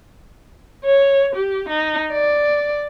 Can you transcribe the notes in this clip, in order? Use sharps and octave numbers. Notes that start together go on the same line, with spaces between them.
C#5
G4
D#4
D5